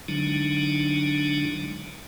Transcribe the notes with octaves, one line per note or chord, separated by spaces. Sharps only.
D3 F#3 G#3 D4 D#4